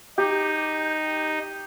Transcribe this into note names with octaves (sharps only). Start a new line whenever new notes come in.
D#4 G4